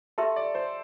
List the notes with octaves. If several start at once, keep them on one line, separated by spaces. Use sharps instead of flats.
G4 A4 E5 A5 C6
D5
C5